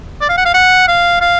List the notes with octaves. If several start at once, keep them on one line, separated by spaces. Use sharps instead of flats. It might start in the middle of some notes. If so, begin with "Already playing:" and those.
D5
F5
F#5
F5
F#5
F5
F5